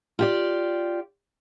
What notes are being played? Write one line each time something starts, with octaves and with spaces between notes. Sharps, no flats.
F4 G4 D5